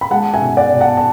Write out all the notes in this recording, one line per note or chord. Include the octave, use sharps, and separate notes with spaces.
B5
G#3 F#5 A5
E5 G#5
B2
D5 F#5
B2
F#5 A5
A5